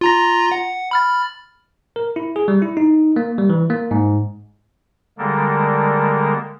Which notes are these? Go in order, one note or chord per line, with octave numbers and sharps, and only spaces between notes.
F4 A#5 A#6
F#5
B5 F6 A6
A#4
E4
G#4
G3
E4
D#4
A#3
G3
E3
A#3
G#2
D3 G3 G#3 A#3 A4 A#4